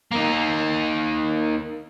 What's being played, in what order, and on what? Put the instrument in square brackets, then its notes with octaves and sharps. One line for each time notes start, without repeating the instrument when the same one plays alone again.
[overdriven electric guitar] A#3 D#4